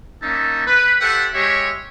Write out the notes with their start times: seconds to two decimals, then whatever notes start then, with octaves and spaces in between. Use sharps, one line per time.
0.23 A#3 C#4 D#4 E5 A5
0.66 B4
1.01 G4 A4 C5 E5 F#5
1.34 G#3 G4 C#5 E5